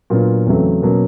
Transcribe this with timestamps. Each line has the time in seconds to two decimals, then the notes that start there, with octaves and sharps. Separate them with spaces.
0.10 A#2 F#3 B3 D4 F4
0.46 E2 C#3 F#3 A3 C4
0.82 B2 F#3 A#3 C#4